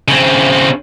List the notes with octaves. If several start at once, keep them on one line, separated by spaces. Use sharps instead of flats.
C#3 C4